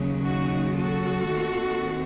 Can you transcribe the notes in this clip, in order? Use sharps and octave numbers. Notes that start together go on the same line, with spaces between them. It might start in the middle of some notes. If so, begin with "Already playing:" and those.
Already playing: D#2 C#3 F#3
D#4 F#4
F#4 A4
D#2 D#3 A3 C4